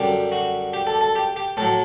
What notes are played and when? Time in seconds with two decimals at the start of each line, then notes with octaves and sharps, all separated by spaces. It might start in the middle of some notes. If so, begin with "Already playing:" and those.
Already playing: F#2 D3 G3 G4
0.32 F#4
0.73 G4
0.87 A4
1.01 A4
1.16 G4
1.36 G4
1.57 A2 F#3 A4